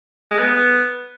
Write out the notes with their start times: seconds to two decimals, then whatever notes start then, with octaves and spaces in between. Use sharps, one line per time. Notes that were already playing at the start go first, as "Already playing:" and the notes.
0.31 G#3
0.39 B3